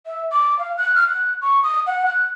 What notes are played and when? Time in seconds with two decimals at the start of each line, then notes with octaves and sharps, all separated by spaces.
0.06 E5
0.32 D6
0.59 F5
0.77 F#6
0.95 F6
1.09 F#6
1.41 C#6
1.63 D#6
1.87 F#5
2.06 F#6